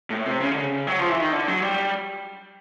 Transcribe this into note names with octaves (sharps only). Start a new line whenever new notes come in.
A2
C3
C#3
D3
C#3
F#3
F3
E3
D#3
D3
F#3
G3